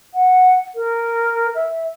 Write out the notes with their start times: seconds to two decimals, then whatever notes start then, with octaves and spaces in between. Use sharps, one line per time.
0.14 F#5
0.75 A#4
1.54 E5